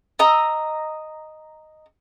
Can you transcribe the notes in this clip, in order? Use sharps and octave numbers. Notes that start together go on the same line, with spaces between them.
D#5 A#5 E6